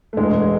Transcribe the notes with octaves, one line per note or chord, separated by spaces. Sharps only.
A3
E1 G#3